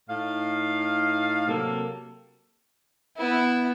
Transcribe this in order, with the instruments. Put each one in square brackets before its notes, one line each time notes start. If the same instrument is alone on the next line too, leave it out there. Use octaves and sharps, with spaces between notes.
[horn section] A2 D#4 F5
C3 F#3 A#3 C4 A4
[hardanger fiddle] B3 E4